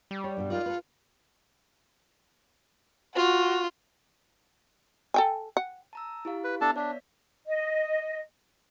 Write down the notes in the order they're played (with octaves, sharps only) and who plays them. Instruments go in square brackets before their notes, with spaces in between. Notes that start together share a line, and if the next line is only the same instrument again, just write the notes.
[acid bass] G3
[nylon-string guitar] C#5
G2 B2 A4
[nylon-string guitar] D#4 A#4 D5 [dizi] F4
[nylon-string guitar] A4 B4
[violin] F4 [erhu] F#4
[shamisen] A4 G5 G#5
F#5
[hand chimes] A5 A#5 E6
E4 G4 F5
[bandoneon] B4
[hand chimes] B3 E5 [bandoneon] D4 A4 A5
[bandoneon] D4 [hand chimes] C#5 D5 B6
[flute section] D#5